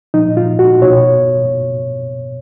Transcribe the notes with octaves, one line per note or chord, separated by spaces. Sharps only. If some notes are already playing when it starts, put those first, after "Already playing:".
A#2 F3 D#4
F4
F#4
B2 C#5